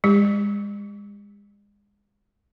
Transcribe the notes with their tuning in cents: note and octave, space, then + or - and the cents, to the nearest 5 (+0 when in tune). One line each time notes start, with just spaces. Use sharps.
G#3 -30 G4 +30